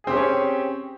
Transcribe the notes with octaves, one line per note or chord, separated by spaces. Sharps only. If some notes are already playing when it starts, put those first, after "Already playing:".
C4 C#4 G4 G#4 C#5